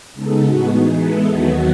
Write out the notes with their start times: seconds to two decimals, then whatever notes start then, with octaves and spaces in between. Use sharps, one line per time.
0.13 C#3 G#3 B3 D#4 A4
0.42 A2 G#3 B3 F#4
0.71 E3 B3 D#4 G#4
0.98 E3 G#3 B3 E4 A4
1.27 D#2 D#3 F#3 B3 F#4